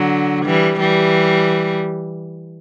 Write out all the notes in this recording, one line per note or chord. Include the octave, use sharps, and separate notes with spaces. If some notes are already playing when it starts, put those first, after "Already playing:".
Already playing: D3 F#3
E3 G3
E3 G3